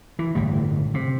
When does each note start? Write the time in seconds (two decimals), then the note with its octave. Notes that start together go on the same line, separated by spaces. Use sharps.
0.19 E3
0.35 G1 A2 G3
0.94 C3